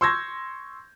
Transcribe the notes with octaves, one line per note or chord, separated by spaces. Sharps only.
C6 C#6 E6 G6 G#6 A#6